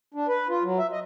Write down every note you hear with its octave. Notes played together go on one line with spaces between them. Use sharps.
D4
B4
F4
F#3
E5
D#5